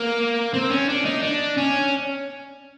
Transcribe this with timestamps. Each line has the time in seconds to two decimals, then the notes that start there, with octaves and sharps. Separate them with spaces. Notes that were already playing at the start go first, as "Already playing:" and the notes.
Already playing: A#3
0.54 C4
0.70 C#4
0.89 D4
1.05 D#4
1.23 D4
1.58 C#4